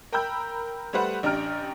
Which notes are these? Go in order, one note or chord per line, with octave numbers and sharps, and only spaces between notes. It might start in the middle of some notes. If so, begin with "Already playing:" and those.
A#4 G5 A#5 B5 E6 G6
G3 A3 B4 C5 F#5
A1 D4 G4 A#5 F6 D7